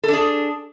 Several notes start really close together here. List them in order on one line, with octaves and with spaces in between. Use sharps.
A4 D4 G#4